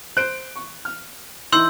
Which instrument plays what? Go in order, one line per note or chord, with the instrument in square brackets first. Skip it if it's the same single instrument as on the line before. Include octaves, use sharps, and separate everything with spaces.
[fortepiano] C5 [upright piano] F#6 D7
[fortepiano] C#6
F6
[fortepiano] E3 D#4 E4 [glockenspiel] C6 E6 G6 [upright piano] F#7